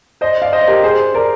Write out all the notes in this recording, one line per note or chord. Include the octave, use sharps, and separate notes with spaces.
C5 D#5
D5 F5
C5 D#5
G4 A#4
G#4 C5
A#4 D5